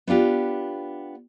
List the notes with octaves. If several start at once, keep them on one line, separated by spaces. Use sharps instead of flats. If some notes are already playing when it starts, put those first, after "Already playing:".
B3 D4 F4 G4